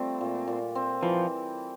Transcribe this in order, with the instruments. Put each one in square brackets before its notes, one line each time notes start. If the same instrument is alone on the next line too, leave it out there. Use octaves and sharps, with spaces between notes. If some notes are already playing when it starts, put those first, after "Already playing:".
Already playing: [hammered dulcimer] G3 A3 F4 [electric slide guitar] C4
[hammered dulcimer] A#2
A#2
C4
[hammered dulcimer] E3 [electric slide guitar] F3